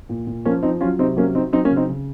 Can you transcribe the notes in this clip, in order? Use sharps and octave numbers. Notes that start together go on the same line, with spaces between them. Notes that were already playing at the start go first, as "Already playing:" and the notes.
A#2
A#2
F3 A#3 C#4
F3 C4 D#4
F#3 C#4 F4
C3 C4 D#4
F#3 A#3 C#4
F#3 C4 D#4
F#3 C4 D#4
A#3 C#4
C#3
C4 D#4
C#3